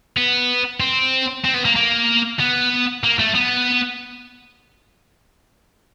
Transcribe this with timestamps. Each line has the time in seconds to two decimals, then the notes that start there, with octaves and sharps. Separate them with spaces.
0.17 B3
0.80 C4
1.45 C4
1.54 B3
1.65 A#3
1.76 A#3
2.39 B3
3.04 A#3
3.19 A3
3.35 B3